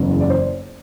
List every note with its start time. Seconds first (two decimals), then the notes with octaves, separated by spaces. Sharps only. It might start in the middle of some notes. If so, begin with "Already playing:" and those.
Already playing: F#1 E2 C#3 F#3
0.21 D5
0.30 C5